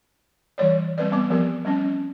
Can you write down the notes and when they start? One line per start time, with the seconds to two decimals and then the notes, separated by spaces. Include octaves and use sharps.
0.58 E3 G3 C#5 D5
0.98 G3 C4 B4 D5
1.11 G3 B3 C4 D6
1.30 F3 B3 G4 A#4
1.65 G3 C4 C#4